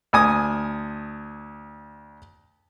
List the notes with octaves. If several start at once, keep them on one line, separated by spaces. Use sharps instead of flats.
D2 G#5 D#6